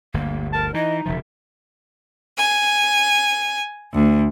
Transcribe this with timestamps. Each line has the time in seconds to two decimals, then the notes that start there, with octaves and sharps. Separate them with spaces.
0.14 G1 D2 A#3
0.53 A#4 A5
0.74 E3 D#4 D#5
1.06 E1 C#3 F3 E5
2.37 G#5
3.94 D2